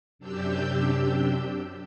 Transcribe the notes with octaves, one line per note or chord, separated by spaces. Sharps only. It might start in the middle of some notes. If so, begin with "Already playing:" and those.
F#2 C3 D4 G4 E6 G6